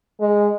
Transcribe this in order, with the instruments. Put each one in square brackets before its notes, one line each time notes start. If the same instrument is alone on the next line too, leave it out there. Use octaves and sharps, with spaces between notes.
[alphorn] G#3